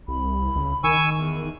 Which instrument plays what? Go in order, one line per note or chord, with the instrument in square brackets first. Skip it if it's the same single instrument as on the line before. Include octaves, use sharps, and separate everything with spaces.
[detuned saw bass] C2 [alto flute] B5
[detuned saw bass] C#2
[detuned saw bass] D#3 [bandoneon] G#5 C#6 E6
[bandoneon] E2